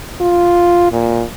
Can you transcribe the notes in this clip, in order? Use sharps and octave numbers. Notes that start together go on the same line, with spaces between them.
F4
A#2